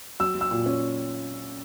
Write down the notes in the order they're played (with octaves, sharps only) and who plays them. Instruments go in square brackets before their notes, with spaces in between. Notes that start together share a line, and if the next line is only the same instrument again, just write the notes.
[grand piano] F#3 E6
F#3
E6
A#2
C#4